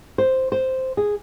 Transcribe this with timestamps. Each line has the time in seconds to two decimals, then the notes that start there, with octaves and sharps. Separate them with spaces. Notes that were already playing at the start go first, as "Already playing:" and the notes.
0.18 C5
0.52 C5
0.97 G#4